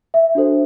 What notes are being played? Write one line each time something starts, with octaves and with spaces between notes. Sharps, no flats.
E5
D4 F#4 A4 C5